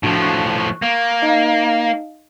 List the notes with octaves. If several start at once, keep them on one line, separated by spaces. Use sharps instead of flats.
A2 F3 D4 F#4
C#6 F#6
A#3
D#4 D#5 F5